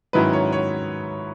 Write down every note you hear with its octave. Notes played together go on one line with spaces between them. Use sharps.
G#2 D#3 F#3 C#4 E4 B4
C#5
C#5